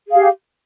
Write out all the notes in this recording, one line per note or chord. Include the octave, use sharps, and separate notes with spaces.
G4 G#4 F5